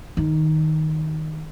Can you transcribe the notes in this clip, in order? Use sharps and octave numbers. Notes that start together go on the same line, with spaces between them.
D#3